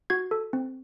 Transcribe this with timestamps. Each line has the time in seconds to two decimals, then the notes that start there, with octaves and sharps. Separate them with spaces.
0.10 F#4 G#6
0.31 A4
0.53 C4